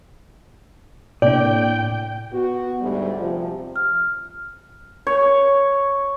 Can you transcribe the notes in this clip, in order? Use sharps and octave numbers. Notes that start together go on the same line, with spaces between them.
A2 C3 A#3 D4 D5 G5
B3 F#4
D2 G#2 G3
C3 F3
F6
C#5